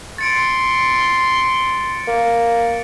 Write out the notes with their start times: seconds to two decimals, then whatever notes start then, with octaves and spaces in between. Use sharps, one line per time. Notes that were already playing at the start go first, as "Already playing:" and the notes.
0.18 C6 A6 C#7 D7
2.07 A#3